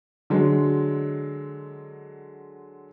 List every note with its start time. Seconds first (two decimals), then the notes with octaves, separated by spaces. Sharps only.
0.30 D3 F#3 G#3